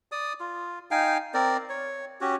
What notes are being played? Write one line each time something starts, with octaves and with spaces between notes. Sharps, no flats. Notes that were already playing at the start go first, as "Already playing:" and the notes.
D5 D#6
F4
D#4 F5 G5 G#5
C4 A#4 D5
C#5
C#4 F#4 G4